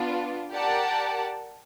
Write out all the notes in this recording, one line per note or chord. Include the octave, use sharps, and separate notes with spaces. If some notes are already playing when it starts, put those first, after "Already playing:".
Already playing: B3 D4 F4
G4 A#4 D5 F#5 A5